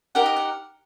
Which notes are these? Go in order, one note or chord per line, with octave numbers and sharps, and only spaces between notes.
D#4 G4 A#4 F#5
D#5
F#5